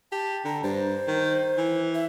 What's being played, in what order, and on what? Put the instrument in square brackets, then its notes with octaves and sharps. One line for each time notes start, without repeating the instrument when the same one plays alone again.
[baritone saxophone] G4 [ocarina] A5
[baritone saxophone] D3 [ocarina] A#5
[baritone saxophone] G2 [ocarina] C5
[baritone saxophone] D#3
E3
[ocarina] E5